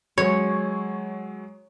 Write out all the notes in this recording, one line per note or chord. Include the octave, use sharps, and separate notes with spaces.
F#3 G#3 C#5